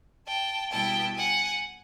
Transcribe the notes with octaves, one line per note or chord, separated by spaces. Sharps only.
G5 A5
B2 G3 B3 E4 G5 A5
F#5 G#5